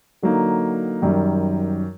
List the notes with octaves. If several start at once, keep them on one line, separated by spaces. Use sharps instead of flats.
D3 F#3 A#3 D#4
F#2 D#3 G3